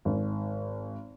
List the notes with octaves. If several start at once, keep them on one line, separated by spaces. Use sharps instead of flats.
G#1